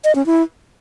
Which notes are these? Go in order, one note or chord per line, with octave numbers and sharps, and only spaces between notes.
D#5
C#4
E4